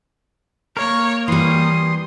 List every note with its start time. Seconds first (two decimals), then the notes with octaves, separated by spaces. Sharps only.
0.77 A#3 A#4 C#5
1.28 E3 G3 C6 D#6